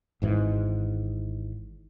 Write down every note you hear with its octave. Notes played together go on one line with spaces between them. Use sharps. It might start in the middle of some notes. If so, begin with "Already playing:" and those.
G#1 G#2 B2 E3